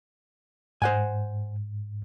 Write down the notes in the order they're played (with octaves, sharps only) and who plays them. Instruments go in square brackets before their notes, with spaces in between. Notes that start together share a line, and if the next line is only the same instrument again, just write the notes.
[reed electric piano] G#2 [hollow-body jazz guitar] C5 F#5 G#5